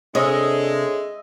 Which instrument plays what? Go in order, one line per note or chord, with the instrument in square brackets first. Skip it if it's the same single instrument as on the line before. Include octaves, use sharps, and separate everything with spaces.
[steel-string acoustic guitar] C3 C#5 [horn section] G#3 [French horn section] D4 A4 [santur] D#5 E5